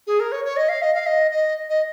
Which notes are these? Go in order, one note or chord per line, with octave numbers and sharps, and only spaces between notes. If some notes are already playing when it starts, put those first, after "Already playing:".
G#4
A#4
C#5
C#5
D#5
F5
D#5
F5
D#5
D#5
D#5